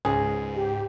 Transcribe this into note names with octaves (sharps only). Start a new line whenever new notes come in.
C#2 G#2 G#4
G4